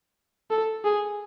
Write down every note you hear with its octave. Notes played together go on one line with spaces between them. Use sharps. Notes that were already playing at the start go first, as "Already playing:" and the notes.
A4
G#4